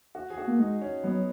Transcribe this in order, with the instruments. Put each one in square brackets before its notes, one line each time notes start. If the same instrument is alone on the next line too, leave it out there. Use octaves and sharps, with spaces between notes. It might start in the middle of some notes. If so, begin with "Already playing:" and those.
[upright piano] F#4
G#4
F#4
[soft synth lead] A#3
[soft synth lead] G#3 [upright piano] D#4
[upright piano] C#4
[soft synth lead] F#3 [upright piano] B3